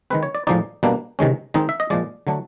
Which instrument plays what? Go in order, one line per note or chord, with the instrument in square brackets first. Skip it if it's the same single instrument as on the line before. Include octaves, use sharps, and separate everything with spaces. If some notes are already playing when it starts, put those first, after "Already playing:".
[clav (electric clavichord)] D#3 G#3 C4 B4
C#5
D5
A2 F3 G#3 C4 D#4 D5
B2 G3 A#3 D4
C3 D#3 G#3 C#4
D#3 G#3 C4 D#4
E5
D#5
A#2 F3 G#3 D5
D3 F#3 A3 D4